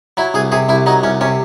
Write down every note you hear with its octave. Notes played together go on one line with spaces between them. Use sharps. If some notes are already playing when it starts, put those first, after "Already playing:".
F#3 E4
C2 G#4
C3 G#4
C2 E4
F#3 D#4
C2 C#4
C3 C#4